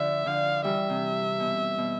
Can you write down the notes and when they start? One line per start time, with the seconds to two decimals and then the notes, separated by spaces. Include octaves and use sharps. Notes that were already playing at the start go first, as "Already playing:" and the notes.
Already playing: D3 F3 E5
0.26 D3 F3 F5
0.64 E3 G3 E5
0.90 C3
1.40 B2
1.78 B2